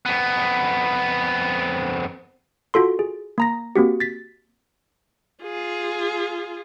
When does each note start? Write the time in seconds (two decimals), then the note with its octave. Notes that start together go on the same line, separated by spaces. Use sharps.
0.06 F2 B3
2.74 F4 F#4 A4 C6
2.99 G#4
3.38 A#3 A#5 A#6
3.76 A#3 C4 F#4 G4
4.00 A6 B6
5.42 F4 G#4